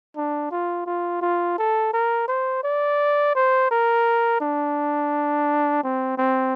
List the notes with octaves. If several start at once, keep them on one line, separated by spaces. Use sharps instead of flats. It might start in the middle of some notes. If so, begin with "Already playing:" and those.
D4
F4
F4
F4
A4
A#4
C5
D5
C5
A#4
D4
C4
C4